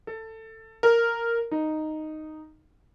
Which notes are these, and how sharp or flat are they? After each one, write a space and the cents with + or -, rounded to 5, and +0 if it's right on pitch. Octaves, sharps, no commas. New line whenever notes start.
A4 +15
A#4 -5
D#4 -5